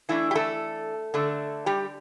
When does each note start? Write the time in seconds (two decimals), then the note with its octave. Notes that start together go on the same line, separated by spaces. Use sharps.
0.09 E3 A3 D4 E4
0.31 G4
0.35 A3 A4
1.14 D3 A3 D4
1.66 G3 G4